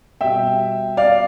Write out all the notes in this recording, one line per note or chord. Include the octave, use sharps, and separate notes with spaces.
B2 G3 E5 G5
D5 F5